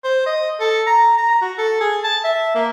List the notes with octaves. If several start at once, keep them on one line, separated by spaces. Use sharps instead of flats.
C5
D#5
A4
A#5
A#5
F#4
A4
G#4
A5
E5
A#3